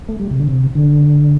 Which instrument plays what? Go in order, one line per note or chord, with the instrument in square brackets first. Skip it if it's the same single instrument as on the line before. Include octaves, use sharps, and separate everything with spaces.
[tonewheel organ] A3
G3
C3
D3
C3
D3